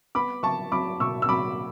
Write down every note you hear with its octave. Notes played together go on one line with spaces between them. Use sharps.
B3 B5 D6
F#3 A5 C#6
F#3 B5 D6
B2 C#6 E6
E6
F#3 B5 D6